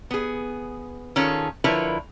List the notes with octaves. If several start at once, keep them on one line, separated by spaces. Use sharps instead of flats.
B3 G#4
D#3 C#4 F4 G#4 A4
D3 F3 E4 A#4 B4 C#5